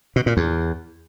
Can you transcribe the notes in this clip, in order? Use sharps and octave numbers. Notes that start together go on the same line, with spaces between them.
B2
A#2
E2